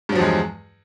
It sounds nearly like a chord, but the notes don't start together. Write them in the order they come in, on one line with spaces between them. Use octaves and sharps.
G2 F#3 F3 E2 G#3